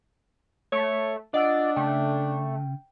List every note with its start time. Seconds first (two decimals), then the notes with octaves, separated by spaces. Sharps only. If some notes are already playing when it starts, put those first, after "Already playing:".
0.72 A3 C#5
1.34 D4 F4 D5 D#5 F#5 E6
1.76 C#3 A3 G5